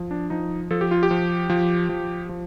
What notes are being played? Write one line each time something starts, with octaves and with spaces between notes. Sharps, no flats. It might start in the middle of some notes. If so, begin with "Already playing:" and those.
Already playing: F3
D4
F3 D#4
F3 A4
G4
F4
G4
F3
F3
F3
F3